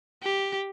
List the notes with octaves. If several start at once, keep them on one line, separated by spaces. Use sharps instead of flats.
G4